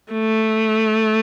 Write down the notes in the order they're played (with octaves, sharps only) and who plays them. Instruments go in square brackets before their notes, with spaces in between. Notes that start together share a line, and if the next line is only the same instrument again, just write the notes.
[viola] A3